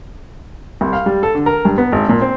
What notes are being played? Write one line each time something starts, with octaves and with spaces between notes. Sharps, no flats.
C2
F5
G3
A4
D3
A#4
G2
B3
G#1
A#2
C4